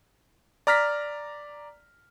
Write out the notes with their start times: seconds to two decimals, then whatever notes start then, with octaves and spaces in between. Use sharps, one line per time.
0.67 D5 A#5 F6 A#6 B6